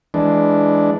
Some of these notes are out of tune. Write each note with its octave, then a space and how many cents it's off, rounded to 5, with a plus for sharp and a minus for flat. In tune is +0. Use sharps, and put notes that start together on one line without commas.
E3 +5 G#3 +20 D4 +0